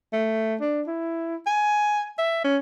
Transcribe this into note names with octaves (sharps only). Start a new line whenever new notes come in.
A3
D4
E4
G#5
E5
C#4